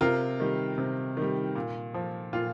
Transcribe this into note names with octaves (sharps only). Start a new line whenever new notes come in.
C3 F4 A#4
D#3 G3
C3
D#3 G3
A#2
F3
A#2 F4